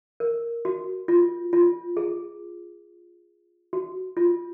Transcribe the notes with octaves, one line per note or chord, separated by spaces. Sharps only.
A#4
F#4
F4
F4
G#4
F#4
F4